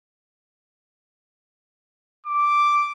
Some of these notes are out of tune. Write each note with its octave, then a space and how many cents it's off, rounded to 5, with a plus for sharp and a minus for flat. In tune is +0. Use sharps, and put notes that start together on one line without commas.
D6 +0